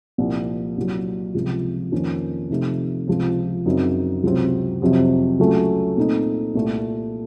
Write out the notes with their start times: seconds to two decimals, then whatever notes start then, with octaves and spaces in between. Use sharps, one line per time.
0.18 C2 A#2 F3
0.77 C2 A#2 F#3
1.35 C#2 C3 F3
1.92 F2 D#3 A#3 C#4
2.50 C3 F3 A3 D#4
3.07 C#2 C3 F3 C4
3.66 F#2 C#3 F#3 C4 D#4
4.23 C#2 C3 F#3 C4
4.82 F2 C3 F#3 C4
5.39 C#2 C#3 F#3 A3 C#4
5.98 A#2 A3 C4 D#4
6.55 C2 A#2 A3